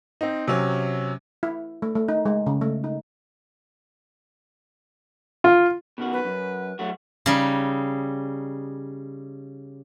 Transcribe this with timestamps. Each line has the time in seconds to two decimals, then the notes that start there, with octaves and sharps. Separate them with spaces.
0.21 C4 D#4
0.47 C3 F#3 C#4
1.43 E4
1.82 A3
1.95 A3
2.09 D#4
2.25 G#3
2.46 C#3
2.61 A3
2.84 D#4
5.44 F4
5.98 B2 D#3 F#4
6.13 B4
6.25 F#2
6.79 F#3 A3 F#4
7.26 C#3 G3 D#4